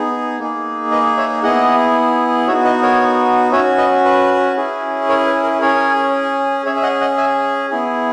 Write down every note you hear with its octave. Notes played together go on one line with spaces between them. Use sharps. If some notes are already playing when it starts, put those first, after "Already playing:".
Already playing: B3 D#4 G#4
A#3 D#4 G#4
B4 D#5
C#5 E5
B3 E4 G#4 D#5 F#5
B3 D#4 F#4 C#5 E5
B4 D#5
A#4 C#5
C#4 F#4 C#5 E5
B4 D#5
B4
C#4 E4 G#4
A#4 C#5
B4
A#4
C#4 G#4 A#4 C#5
C#4 G#4 C#5 E5
E5
D#5 F#5
D#5 F#5
E5 G#5
B3 E4 G#4